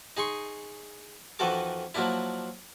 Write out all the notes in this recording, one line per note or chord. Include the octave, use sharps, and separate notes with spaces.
D#4 G#4 C6 C#6
F2 D#3 E3 F#4 A4 D6
F3 F#3 A#3 D4 E4